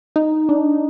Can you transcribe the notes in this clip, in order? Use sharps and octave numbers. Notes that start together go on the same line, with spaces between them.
D#4
D4